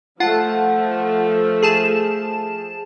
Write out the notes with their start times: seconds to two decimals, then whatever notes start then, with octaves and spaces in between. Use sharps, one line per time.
0.20 F3 A3 F4 F#5 A5
1.62 G#4 A5 E7